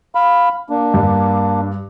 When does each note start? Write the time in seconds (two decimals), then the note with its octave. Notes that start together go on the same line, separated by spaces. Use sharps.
0.15 F5 B5
0.70 A#3 D4
0.94 G2